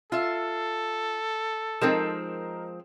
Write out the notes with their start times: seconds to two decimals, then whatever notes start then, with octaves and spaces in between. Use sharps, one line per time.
0.12 F4 A4 E5
1.81 F3 G#3 C4 D#4 A#4 E7